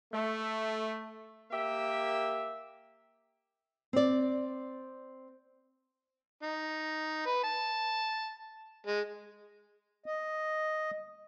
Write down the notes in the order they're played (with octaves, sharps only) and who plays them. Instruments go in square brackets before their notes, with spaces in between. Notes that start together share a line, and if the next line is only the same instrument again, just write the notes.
[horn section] A3
A#3 G4 E5
[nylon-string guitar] C4 D5
[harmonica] D#4
B4
A5
G#3
[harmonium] D#5